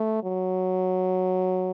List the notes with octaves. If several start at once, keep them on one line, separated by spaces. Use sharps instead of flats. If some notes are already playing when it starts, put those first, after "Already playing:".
Already playing: A3
F#3